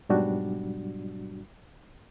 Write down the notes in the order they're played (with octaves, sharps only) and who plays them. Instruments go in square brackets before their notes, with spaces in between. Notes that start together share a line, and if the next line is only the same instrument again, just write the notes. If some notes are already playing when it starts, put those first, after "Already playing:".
[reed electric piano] G#2 B2 F#3 G3 D4 F#4